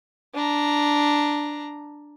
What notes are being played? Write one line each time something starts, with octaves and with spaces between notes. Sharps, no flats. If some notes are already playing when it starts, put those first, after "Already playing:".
D4 A#5